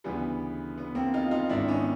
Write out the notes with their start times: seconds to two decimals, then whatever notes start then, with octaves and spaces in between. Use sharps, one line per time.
0.04 D2 C#3 E3 G3 B3
0.78 B3
0.95 A#3 C4
1.14 D#4 F4
1.31 D#4 F4
1.49 G#1 G#2 D#3 D4 E4
1.68 B3 C#4